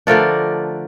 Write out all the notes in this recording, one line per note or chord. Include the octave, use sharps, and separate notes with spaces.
D3 F3 A3 D4 A#4 D5